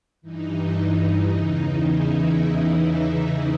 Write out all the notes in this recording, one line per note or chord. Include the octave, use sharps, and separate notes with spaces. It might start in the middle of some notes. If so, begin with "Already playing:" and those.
G2 E3 D#4
E2 C#3 E3
E4